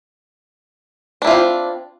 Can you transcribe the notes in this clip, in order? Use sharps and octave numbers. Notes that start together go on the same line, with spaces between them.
C4 D4 E4 F4